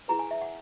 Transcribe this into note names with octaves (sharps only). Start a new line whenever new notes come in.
E4 G#4 B4 A#5
G#5
E5
F#5